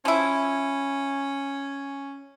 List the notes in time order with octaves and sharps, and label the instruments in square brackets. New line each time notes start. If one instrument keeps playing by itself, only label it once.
[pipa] F3 E4 [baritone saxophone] C#4